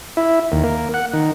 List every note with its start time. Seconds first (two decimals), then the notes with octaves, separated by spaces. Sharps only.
0.17 E4
0.52 D#2
0.64 A#3
0.94 F#5
1.13 D#3